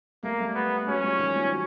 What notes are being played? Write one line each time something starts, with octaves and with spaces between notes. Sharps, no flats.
G3 A3 A#3
G3 A3
B3
F#3 G#3 C#4
F3 G3
D#3 F3
F3 G3
F#3